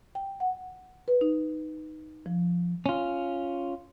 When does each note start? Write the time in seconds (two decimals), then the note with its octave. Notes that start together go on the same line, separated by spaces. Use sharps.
0.15 G5
0.40 F#5
1.08 B4
1.21 D#4
2.26 F3
2.86 C#4 F4